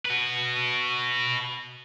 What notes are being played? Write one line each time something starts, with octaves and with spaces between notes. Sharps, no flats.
F#4 B4